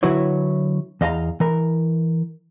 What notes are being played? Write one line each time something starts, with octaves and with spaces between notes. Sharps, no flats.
D3 F#3 E4 F#4 B4 C#5
E2 D#5 F5 A5 A#5
E3 A#4